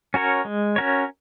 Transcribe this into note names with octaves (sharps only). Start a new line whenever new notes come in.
C#4 F#4 A#4 C#5
G#3
C#4 F#4 A#4 C#5